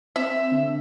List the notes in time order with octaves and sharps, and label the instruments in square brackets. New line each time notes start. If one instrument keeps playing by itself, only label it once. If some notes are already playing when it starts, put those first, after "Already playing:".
[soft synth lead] C4 [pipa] E5
[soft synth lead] D3